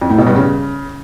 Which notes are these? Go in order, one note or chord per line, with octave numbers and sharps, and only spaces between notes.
F2
A2
B2
G2
C#3